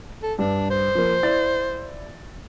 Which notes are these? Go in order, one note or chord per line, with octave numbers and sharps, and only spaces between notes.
A4
G2 D4
C5
F3 A#3
E4 D5 A6